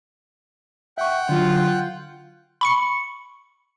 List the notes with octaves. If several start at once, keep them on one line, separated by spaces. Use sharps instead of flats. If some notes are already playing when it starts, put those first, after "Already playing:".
E5 F#5 G5 C#6 F#6
D3 F#3 F4
B5 C#6 C#7